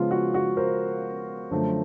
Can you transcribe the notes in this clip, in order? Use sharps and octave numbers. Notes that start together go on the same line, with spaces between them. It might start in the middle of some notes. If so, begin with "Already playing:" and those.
Already playing: C#3 F3 G#3 B3 F4
F#4
F#4
A#4 C5
F#2 D3 F3 A3